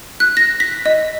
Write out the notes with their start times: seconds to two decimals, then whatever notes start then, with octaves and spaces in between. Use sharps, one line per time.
0.20 F#6
0.37 A#6
0.60 B6
0.86 D#5